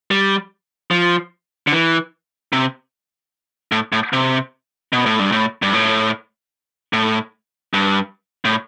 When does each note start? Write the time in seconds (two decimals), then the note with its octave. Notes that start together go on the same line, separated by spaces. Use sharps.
0.11 G3
0.91 F3
1.67 D3
1.72 E3
2.53 C3
3.72 A2
3.92 A2
4.13 C3
4.93 B2
5.06 A2
5.20 G2
5.32 A2
5.62 G2
5.73 A2
6.93 A2
7.74 G2
8.45 A2